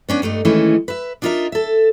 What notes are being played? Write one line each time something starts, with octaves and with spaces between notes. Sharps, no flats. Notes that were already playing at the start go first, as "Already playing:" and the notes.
B3 C#4 D4
G2 A3 D4 D#4
D#3 E3 G#3 A3 C#4 E4
B4 E5
D4 D#4 F4 F#4 A#4 E5
A4 E5